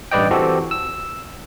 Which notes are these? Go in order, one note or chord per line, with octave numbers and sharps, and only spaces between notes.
A1 G2 B4 D5 D#5 G5
E3 C4 F#4 G4 A4
E6